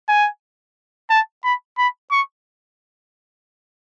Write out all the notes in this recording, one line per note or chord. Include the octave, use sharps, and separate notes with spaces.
G#5
A5
B5
B5
C#6